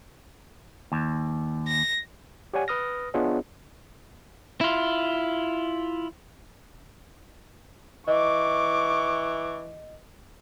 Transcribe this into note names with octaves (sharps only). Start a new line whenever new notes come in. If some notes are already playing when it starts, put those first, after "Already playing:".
D#2
A#6
G4 C#5 D5 F#5 G#5
B4 D#6 F6 A#6
B3 D4 F4 G#4 C#5 D#5
E4 F4
E3 D#5 C#6 D6